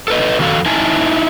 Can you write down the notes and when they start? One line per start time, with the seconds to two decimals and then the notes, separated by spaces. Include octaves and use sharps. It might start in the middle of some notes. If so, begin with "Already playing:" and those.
0.08 A4 B4 D#5
0.39 F2 D#3 F#4 A4 F5
0.66 D#4 E4 G#5 A5